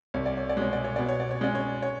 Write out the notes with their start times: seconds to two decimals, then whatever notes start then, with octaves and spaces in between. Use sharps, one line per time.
0.14 C2 C#5
0.26 D5
0.37 C#5
0.49 D5
0.57 B2 G#3 C#5
0.73 D5
0.84 C#5
0.96 B2 D5
1.09 C#5
1.20 D5
1.31 C#5
1.41 G#3 C#4 D5
1.55 C#5
1.82 C#5